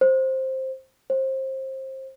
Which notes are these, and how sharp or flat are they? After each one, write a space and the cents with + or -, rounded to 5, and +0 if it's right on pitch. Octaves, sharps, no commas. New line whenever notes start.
C5 +10
C5 +25